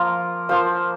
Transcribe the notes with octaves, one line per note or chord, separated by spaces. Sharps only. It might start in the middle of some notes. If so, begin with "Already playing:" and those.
Already playing: F3 A#3 F4 A#4
F3 A#3 F4 C5